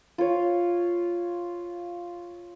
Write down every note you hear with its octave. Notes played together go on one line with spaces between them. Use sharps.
F4 C#5